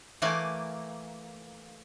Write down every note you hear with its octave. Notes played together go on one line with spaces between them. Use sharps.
E3 A3 A#3 D5 G#5